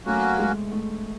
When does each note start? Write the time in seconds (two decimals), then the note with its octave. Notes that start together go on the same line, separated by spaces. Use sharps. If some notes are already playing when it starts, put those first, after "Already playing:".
0.06 F#3 A3 A#3 C#4 F#4
0.39 G#3
0.72 A3